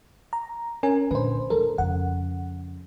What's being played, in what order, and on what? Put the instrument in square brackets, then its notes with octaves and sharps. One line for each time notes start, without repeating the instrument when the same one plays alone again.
[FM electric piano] A#5
C#4 A#4 G#5
[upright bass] A#2 D3 [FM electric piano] B4 C5
[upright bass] D2 D3 [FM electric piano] A4 A#4
[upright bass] F2 C#3 [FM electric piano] F#5